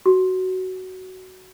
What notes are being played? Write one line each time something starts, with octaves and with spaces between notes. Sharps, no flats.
F#4